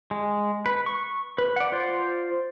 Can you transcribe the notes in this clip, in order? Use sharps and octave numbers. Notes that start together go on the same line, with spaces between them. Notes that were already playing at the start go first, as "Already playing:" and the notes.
G#3
B4
C#6
B4
D5 F#5
F4 C5 D5